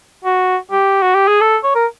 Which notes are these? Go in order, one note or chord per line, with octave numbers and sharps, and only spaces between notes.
F#4
G4
F#4
G4
G#4
A4
C#5
A#4